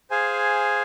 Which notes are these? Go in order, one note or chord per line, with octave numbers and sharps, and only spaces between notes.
G#4 C5 F5 G#5